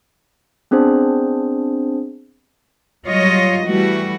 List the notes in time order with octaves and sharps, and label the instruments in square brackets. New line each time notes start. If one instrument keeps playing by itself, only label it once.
[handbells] B3 C4 D4 G#4 C5
[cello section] F#3 G3 F4 C#5 D#5
E3 G3 A3 F#4